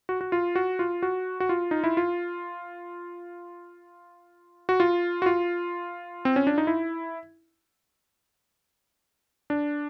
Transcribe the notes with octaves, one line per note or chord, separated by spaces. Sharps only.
F#4
F#4
F4
F#4
F4
F#4
F#4
F4
D#4
E4
F4
F#4
F4
F#4
F4
C4
C#4
D4
D#4
E4
D4